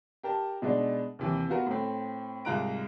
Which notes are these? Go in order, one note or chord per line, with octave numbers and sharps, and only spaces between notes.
G4 A#4 A5
B2 G#3 D4 D#4
D#2 C3 E3
B3 F4 F#4 A#4
A2 C4
C2 G#2 F4 A#5 F#6 D7